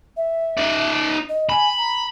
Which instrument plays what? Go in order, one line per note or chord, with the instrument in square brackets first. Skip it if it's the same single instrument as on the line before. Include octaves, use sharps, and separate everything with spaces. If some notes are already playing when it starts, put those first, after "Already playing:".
[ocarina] E5
[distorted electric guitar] D#4 D5
[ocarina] D#5
[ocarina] G#5 [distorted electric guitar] B5
[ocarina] A#5